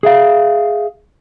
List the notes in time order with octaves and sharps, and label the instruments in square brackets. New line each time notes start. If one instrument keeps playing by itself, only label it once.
[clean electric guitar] G#4 E5 F5